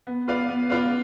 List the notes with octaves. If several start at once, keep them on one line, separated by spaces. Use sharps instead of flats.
B3
F4 B4 D5 F5
B3
F4 B4 D5 F5